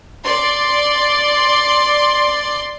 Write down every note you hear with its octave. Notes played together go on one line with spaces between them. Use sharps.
D5 C6